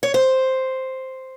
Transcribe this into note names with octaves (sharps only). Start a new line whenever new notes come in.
C#5
C5